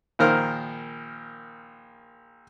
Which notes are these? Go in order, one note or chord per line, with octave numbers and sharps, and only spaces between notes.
A#1 D#3 A#4 C5 F6